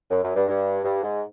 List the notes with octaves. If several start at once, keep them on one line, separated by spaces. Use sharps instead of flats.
F#2
F#2
G2
G2
G2
G#2